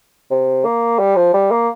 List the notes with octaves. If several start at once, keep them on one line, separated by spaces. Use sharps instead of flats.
C3
A#3
G3
F3
G3
A#3